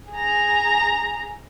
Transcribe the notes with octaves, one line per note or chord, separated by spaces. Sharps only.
G#4 A#5